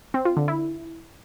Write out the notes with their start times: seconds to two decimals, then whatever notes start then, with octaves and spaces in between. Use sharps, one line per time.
0.14 C4
0.25 F4
0.37 D3
0.48 E4